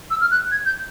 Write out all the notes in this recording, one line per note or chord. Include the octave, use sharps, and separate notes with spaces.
E6
F6
F#6
G#6
G6